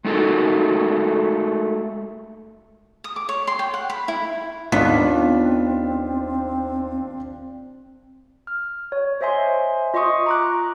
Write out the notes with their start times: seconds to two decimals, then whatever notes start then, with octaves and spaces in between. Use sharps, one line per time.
0.05 G#3 A3 D#4 F#4 A4 A#4
3.04 D#6
3.16 D6
3.29 C#5
3.47 C6
3.59 G5
3.74 F#5
3.90 B5
4.08 E4
4.72 D#2 B3 C4 D4 F4 B6
8.47 F6
8.92 C#5
9.21 C5 D#5 E5 G#5 C6
9.94 F4 D#5 C6 C#6 D#6
10.26 A#5 D6 F#6